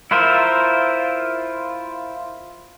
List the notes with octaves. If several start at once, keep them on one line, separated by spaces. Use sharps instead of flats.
E4 F4 A#4 C5 E5